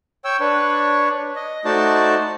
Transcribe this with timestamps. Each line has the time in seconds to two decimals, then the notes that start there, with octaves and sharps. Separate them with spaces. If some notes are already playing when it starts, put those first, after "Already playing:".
0.24 C#5 G5 E6
0.40 D4 B4 C#5
1.36 D#5
1.65 A3 D#4 F#4 C5 D5 A5